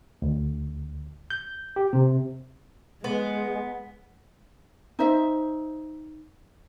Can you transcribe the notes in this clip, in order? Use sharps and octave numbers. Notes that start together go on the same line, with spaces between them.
D2
G6
G4
C3
G#3 B3
D#4 C5 E5